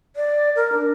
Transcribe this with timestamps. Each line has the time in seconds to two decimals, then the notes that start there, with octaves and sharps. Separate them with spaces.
0.16 D5
0.56 A#4
0.73 D4